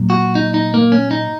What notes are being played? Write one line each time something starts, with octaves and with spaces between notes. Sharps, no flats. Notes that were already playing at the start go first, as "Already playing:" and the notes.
Already playing: A#2 F#3
F#4
D#4
D#4
A#3
C#4
D#4